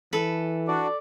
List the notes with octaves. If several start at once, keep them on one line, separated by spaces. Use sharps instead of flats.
E3 A4 B4
D4 F#4 D5